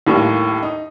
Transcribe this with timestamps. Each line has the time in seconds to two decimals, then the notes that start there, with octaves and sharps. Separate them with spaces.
0.07 D#2 A2 G3 A#3
0.63 D#4